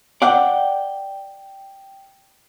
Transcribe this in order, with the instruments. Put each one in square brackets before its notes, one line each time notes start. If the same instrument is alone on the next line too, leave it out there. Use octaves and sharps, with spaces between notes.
[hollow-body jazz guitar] D5 F#5 [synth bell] G5